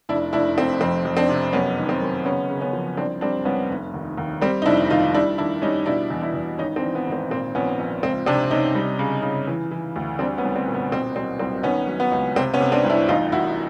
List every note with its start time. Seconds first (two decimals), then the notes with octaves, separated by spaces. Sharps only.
0.09 F1 D4 E4
0.33 F1 D4 E4
0.57 F1 C4
0.81 F2 C4
1.05 F2
1.17 C4 D4
1.29 C3
1.53 F#2 B3 C#4
1.78 D#3
1.89 C4
2.01 F#2
2.25 C#3 B3 C#4
2.50 C#3
2.61 B3 C#4
2.73 F3
2.97 C2 C4 D4
3.21 G3 C4 D4
3.45 C2 B3 C#4
3.70 F1
3.94 D#2
4.18 D#2
4.41 G3 C4
4.62 D#4
4.66 F1 D4 E4
4.90 D#2 D#4 F4
5.14 G3 D4 E4
5.38 D#3 D4 E4
5.62 G3 C#4 D#4
5.86 B2 D4 E4
6.11 E2
6.22 D4 E4
6.34 E2
6.58 G#1 C#4 D#4
6.76 C4 D4
6.82 E3
6.95 B3
7.07 G#1
7.12 C4
7.30 A#2 C4
7.55 A#1 B3 C#4
7.79 A#1
8.02 C#2 C4
8.26 C3 C4 D4
8.51 C3 C#4 D#4
8.75 G3
8.99 C#3
9.23 C#3
9.47 E3
9.71 E3
9.96 D2
10.19 G3 C4 D4
10.38 B3 C#4
10.44 C2
10.56 C4
10.68 A#2
10.74 B3
10.92 B2 C4
11.16 F#3 C4
11.39 C2 C4
11.63 D#3 B3 C#4
11.87 F#3
12.00 B3
12.12 C#2
12.36 C3 C4
12.54 B3 C#4
12.60 C3
12.72 C4 D4
12.84 C2
12.90 D4 E4
13.08 A1 D#4 F4
13.32 A1 E4 F#4